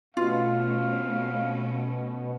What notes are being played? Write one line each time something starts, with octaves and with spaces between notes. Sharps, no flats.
B2 A3 C#4 F4 F5